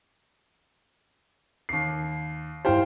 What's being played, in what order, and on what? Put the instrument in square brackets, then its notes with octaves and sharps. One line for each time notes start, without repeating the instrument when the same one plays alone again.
[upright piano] D#2 C7
[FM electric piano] G2 E4 G4 [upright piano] C5 F5 G5